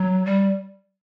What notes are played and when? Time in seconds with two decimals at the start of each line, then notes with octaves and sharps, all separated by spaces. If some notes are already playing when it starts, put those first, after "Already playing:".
Already playing: F#3
0.25 G3